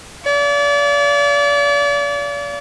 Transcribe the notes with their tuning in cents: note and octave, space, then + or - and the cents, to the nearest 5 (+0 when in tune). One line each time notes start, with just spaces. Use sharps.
D5 -35 F5 -25